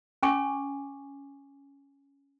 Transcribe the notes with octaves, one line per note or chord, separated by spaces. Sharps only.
C#4 G#5 C#6 D6